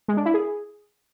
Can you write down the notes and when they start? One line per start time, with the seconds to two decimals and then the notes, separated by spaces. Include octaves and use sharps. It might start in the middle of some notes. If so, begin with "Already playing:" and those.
0.08 G#3
0.17 D4
0.25 E4
0.34 G#4